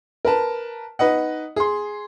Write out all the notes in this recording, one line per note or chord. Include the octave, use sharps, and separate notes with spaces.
A#4 B4 A5
D#4 B4 D#5 F#5
G#4 C6